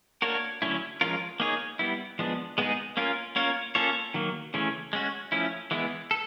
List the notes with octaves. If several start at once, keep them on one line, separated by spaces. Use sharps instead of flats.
A#3 D4 F#4 A#4 C#5
D3 F#3 A3 C#4 E4
F3 G#3 C#4 F4 A#4
A#3 D#4 G#4 C#5
G3 B3 E4
F3 G#3 B3 D4
G#3 B3 D#4 G#4
A#3 C#4 F4 A#4
A#3 C#4 F4 A#4 C#5
A#3 C#4 F4 A4 C#5
D#3 F#3 A#3
C#3 E3 A3 C#4
G#3 C#4 F#4
F3 A3 C#4 E4
E3 G#3 B3 E4
A4